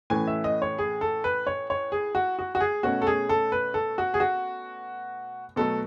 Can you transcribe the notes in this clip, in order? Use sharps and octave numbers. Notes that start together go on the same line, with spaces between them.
A2 E3 A3 C#4 G#5
E5
D#5
C#5
G#4
A4
B4
C#5
C#5
G#4
F#4
F#4
F#4
G#4
B2 A3 C#4 F#4
A4
G#4
A4
B4
A4
F#4
G#4
F#4
B2 F#3 A3 A4